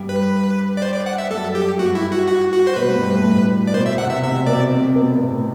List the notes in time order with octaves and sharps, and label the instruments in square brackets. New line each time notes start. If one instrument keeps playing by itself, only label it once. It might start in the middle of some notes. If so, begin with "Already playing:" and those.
Already playing: [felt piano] G2 G3
[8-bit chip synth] B4
D5
C5
D5
F#5
E5
[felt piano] F#2 F#3 [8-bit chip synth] A4
[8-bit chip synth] G4
[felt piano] G2 G3 [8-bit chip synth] F#4
[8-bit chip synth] E4
F#4
F#4
F#4
C5
[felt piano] B2 B3 [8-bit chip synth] B4
[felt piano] G2 G3
G2 G3
A2 A3
A2 A3
[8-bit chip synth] D5
[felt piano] B2 B3 [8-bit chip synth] C5
[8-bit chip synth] E5
[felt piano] C3 C4 [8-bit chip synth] F#5
[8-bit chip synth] E5
[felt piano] C3 C4 [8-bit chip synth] E5
[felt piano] B2 B3 [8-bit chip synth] D5
[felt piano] C3 C4
B2 B3
B3
A2 A3
A3